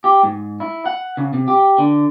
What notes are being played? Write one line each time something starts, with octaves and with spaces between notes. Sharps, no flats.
G4
G#2
E4
F#5
C#3
C3
G4
D3